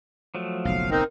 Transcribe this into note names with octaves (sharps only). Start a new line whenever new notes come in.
F3 F#3 A3
F#1 B1 F5
C4 D#4 A#4